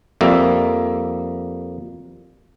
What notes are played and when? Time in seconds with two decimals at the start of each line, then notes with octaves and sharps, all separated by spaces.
0.21 F2 G3 A#3 E5